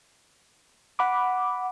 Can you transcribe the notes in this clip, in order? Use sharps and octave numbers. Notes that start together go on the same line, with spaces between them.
F#5 B5 D6